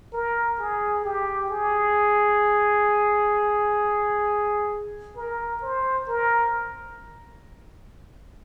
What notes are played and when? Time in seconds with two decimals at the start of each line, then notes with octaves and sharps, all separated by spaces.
0.13 A#4
0.59 G#4
1.05 G4
1.50 G#4
5.16 A#4
5.62 C5
6.08 A#4